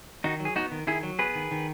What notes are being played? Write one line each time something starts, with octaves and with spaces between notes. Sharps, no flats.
D#3 D#4 F#4
F#3
G#4
B3 D#4 F#4
D#3
D#3 E4 G#4
F#3
B3 G#4 B4
D#3
D#3